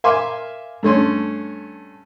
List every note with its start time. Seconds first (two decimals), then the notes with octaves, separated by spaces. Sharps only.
0.04 A#4 E5 F5 G#5 C6 D6
0.83 G2 A3 C#4 C6